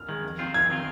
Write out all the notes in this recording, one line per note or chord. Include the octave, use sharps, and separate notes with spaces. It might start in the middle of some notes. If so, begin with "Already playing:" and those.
Already playing: F6
D#3 G#3
F2
D#3 C4 F4
F2 G#6
D#3 C4 F4